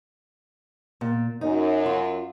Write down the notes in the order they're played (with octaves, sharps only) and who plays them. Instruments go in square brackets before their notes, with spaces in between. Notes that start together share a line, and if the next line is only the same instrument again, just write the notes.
[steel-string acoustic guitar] A#2
[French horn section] F#2 [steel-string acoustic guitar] D#4
[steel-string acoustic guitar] F4